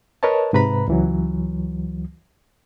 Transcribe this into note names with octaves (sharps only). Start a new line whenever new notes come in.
A#4 B4 C#5 D#5 A5
G#2 C3 B4 A#5 B5
C#2 E3 F#3